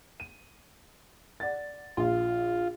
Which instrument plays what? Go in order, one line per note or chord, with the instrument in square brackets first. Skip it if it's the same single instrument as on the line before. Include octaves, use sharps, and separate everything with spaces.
[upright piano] D#7
D5 F#5 A6
[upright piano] A#1 F5 [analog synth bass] F4